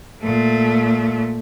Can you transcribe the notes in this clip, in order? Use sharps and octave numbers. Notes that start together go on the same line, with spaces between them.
A#2 A3